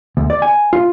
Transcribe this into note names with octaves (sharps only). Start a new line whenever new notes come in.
D2
D5
G#5
F4